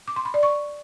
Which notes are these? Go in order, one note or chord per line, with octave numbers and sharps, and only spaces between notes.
D6
C6
B5
D5
C#6